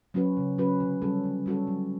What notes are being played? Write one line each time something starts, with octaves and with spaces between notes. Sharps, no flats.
F#3 C#4 F#4 B4
C#3
F#3 C#4 F#4 B4
D3
G3 C#4 F#4 A4
D3
G3 C#4 F#4 A4
F#3